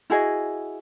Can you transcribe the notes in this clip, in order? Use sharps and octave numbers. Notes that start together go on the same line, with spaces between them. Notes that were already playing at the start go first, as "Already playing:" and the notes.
E4 F#4 G#4 D#5